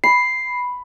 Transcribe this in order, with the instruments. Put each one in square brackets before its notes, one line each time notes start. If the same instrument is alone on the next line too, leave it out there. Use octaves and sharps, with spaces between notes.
[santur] B5 [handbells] C7